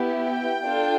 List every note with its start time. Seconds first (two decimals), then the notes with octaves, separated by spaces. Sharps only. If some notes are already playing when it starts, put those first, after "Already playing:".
Already playing: B3 E4 G4
0.19 G5
0.65 D4 F4 A4